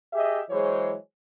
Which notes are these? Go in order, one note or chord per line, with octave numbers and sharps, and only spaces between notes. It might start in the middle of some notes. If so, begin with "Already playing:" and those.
G4 G#4 D#5 E5
E3 F#3 G#3 G#4 C5 C#5